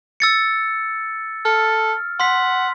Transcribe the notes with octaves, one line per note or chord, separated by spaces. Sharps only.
E6 A6 C#7
A4 F6
F#5 C6 B6